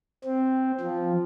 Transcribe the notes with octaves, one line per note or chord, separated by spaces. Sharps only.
C4
F3